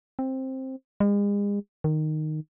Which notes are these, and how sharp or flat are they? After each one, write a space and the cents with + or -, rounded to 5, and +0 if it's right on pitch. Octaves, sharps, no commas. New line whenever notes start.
C4 +10
G#3 -40
D#3 -10